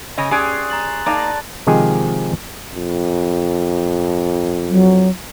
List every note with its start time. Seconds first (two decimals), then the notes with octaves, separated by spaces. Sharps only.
0.18 C#3 C#4 D#5
0.31 C#4 G4 G#4 D5 C6 F#6 A6
0.70 A#5 A6 F#7
1.06 A#3 D#4 D5 A5
1.67 C3 D#3 F3 G#3 G4 G#4
2.75 F2
4.71 F#3